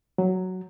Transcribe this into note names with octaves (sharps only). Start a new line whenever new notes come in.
F#3